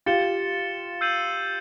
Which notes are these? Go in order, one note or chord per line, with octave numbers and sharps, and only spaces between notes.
F4 G4 A6 C#7 E7 G7
E6 G6 C7 D#7 F#7